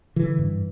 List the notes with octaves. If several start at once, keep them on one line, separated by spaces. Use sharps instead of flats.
D3 E3
G2